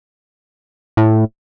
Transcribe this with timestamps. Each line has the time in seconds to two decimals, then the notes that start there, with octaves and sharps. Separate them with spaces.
0.97 A2